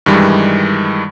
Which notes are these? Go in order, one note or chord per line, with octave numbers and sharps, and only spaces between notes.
G2 D#3 E3 G3 G#3